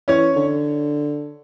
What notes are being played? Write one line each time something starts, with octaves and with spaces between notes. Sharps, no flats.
E3 C#4 C#5
D3